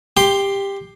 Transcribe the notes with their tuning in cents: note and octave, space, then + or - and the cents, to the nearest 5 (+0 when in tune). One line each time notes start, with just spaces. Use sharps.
G4 +15 C6 +0